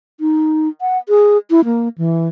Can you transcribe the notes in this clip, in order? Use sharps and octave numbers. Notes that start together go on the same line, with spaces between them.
D#4
F#5
G#4
E4
A#3
E3